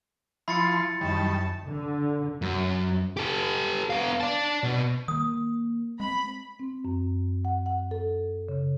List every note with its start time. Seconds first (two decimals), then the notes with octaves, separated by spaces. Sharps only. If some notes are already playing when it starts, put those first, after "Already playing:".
0.48 F3 E4 B5 C6 A6 C#7
1.01 F#2 D#3 G3 A5
1.67 D3
2.42 F#2
3.17 G4 A4
3.90 B3 F5
4.20 D5 A5
4.63 B2
5.08 D#3 A#3 D#6
6.00 G#3 C4 B5
6.59 C4
6.85 F#2
7.45 F#5
7.66 F#5
7.91 A4
8.49 C#3